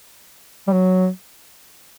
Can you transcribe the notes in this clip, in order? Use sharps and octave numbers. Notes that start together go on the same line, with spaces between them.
G3
F#3